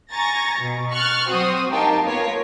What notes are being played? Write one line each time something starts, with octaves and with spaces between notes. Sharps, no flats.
G#5 A#5 C#6 A6 A#6
B2
C#6 F6 F#6 A6
F#3 C4 F#4 C5 D#6
D#4 G4 A#4 F5 G5 A5
A#3 B3 F4 A#4 C#5